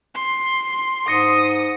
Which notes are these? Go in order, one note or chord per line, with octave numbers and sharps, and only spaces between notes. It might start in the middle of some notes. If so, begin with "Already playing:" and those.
C6
G#2 D#6 A#6 C#7